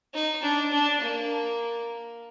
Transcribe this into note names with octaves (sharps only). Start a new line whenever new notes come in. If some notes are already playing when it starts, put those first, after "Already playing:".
D#4
D4
D4
A#3